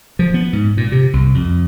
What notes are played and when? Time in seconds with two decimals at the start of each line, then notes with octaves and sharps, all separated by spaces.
0.19 F3
0.34 B3
0.53 G#2
0.77 A#2
0.92 C3
1.13 C2
1.34 F2